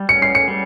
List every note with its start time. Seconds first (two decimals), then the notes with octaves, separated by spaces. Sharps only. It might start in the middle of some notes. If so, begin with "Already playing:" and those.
Already playing: G3
0.09 C#4 C#7
0.22 C7
0.35 C#7
0.48 G3